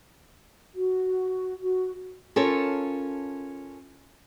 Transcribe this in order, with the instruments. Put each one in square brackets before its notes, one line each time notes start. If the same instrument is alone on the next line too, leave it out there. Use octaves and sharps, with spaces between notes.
[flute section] F#4
F#4
[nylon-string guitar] C#4 F4 A4 A#4 C#5